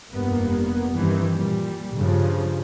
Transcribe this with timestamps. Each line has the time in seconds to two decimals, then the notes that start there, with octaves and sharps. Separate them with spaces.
0.11 F1 G2 A#3 B3
0.95 G2 D#3 E3 C4
1.35 A#2 G3
1.96 G2 C#3 F3